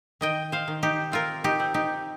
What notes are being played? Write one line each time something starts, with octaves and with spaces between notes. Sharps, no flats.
D#3 D#5 G5
C5 F5
D#3
D#4 G4
C4 F4 A#4
D#4 G4
C4
D#4 G4